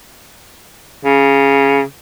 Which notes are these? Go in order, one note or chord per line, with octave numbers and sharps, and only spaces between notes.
C#3